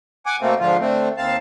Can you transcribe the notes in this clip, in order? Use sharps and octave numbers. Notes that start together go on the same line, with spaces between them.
F#5 G#5 D6
B2 A3 A#3 C4
G#2 D3 F3 F4
D3 A3 C4
D#2 C4 F5 A5